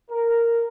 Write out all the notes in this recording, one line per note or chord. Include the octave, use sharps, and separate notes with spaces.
A#4